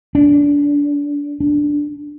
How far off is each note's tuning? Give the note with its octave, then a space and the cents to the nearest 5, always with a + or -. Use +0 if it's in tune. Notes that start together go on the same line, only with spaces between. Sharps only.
D4 -25
D4 +0